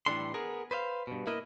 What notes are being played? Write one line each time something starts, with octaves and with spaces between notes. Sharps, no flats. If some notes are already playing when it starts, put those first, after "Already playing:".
A2 E3 G3 D4 A4 C6
B3 G#4 A#4
B4 C5 D#5 F5
G2 B2
A#3 E4 A#4 B4 D#5